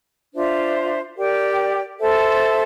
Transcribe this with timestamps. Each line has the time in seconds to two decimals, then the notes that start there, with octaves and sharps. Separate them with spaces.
0.33 D4 F4 C5 E5
1.16 G4 A#4 D5 G5
1.99 A4 C5 E5 A5